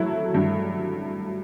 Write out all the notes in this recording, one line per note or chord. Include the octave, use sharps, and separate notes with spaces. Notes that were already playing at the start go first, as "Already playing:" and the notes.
Already playing: F#3 A3 E4
G2